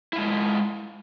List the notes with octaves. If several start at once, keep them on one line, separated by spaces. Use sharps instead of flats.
G#3 E4 F4